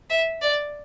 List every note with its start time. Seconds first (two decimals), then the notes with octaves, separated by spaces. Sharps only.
0.10 E5
0.42 D5